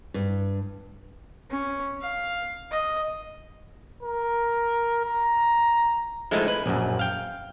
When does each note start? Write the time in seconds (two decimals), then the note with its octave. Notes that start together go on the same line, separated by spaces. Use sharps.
0.14 G2
1.50 C#4
2.01 F5
2.71 D#5
4.03 A#4
5.06 A#5
6.31 F3 G#3 A3 D#4 E4
6.48 B4
6.66 A#1 F#2
6.99 F5 G5